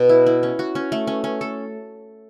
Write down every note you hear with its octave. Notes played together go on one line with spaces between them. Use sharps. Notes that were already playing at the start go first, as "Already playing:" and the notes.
Already playing: B2
E4
E4
C#4
F#4
C#4
A3
C#4
C#4
A4